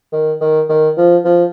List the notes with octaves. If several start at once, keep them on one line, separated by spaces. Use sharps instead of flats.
D#3
D#3
D#3
F3
F3